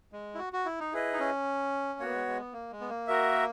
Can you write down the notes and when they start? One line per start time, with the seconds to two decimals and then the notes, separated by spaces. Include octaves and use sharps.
0.13 G#3
0.35 E4
0.39 F#4
0.53 F#4
0.65 E4
0.80 D#4
0.93 E4 G#4 B4 D#5
1.13 D#4
1.19 C#4
1.99 A#3 B3 F#4 C#5
2.13 G#3
2.27 G#3
2.40 B3
2.53 A#3
2.72 G#3
2.81 B3
2.90 A#3
3.07 F#4 A#4 E5